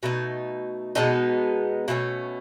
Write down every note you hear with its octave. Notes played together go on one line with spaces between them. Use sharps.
B2 A3 D#4
B2 G#3 B3 D#4 A4
B2 A3 C#4 E4